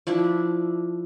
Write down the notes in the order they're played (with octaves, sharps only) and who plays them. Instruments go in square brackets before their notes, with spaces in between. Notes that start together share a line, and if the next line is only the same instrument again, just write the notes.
[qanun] F3 D4 E4